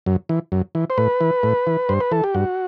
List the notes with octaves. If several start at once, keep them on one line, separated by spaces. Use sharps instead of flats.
F#2
E3
F#2
E3
C5
A2 B4
E3
A2
E3
G2 C5
B4
E3 A4
G4
G2 F#4